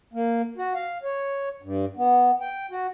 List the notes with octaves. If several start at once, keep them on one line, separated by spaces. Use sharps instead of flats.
A#3
F#4
F5
C#5
G2
B3
G5
F#4